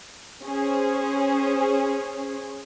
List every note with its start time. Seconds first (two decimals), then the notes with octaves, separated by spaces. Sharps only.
0.43 C#4 G#4 C5